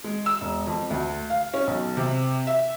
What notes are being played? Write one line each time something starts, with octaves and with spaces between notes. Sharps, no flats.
G#3
E6
E1
F2
D2
F5
C#4
B1
C3
E5